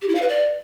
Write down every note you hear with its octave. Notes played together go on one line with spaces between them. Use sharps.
G4
E4
F5
B4
D5